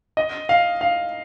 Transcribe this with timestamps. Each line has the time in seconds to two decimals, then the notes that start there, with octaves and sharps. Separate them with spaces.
0.17 D#5
0.49 F5
0.81 F5